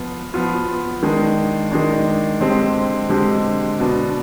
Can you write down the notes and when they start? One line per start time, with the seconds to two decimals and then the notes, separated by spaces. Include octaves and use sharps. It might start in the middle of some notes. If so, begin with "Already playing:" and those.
Already playing: F3 B3 F4
0.34 F3 B3 F4
1.03 D#3 G#3 D4
1.71 D#3 G#3 D4
2.40 D3 G#3 C4 G4
3.09 D3 G#3 C4 G4
3.79 B2 B3 D4